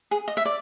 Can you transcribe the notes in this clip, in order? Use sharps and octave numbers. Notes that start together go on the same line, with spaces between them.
G#4
D#5
E5
D5